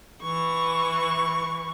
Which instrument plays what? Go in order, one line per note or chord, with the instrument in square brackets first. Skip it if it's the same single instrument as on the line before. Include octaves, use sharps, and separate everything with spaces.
[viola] E3 C#6